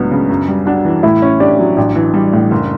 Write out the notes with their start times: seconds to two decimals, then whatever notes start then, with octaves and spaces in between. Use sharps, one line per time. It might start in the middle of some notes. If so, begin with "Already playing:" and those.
Already playing: C#2 A2 F#3 B3 D4
0.11 C#3
0.29 F#2
0.48 G3
0.66 D4 F#4 F#5
0.85 E3
1.03 A2 E4 E5
1.22 C#4
1.40 D4 G4 D5
1.59 F#3
1.77 A1 D4 D5
1.95 E3
2.14 G3
2.33 A2
2.51 F#1